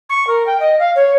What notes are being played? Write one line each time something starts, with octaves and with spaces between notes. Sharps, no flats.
C#6
A#4
G5
D#5
F5
C#5